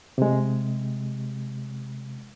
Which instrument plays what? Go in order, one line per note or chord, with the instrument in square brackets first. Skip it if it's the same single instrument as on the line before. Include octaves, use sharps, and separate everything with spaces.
[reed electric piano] C3 G#3